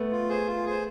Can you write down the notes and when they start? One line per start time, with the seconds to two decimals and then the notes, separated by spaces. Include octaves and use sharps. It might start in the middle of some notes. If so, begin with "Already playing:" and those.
Already playing: A3 B3
0.11 F4
0.29 G#4 C5
0.47 F4
0.66 G#4 C5